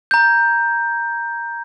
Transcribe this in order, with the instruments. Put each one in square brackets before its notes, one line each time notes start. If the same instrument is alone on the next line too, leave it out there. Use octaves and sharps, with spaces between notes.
[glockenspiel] A#5 G6